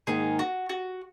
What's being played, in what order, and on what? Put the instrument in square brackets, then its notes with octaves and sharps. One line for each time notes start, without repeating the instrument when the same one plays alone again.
[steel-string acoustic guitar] G#2 D#3 A#3 D#4 A#4 [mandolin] G#4
[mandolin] F#4
F#4